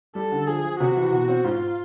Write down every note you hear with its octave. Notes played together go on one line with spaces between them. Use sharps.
G3 A4
D3
F3 G#4
F3
C3 F#4
E3
B2
C4
G#2 F4